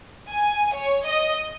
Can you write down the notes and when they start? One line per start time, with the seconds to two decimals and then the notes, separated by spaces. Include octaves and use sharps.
0.30 G#5
0.75 C#5
1.07 D#5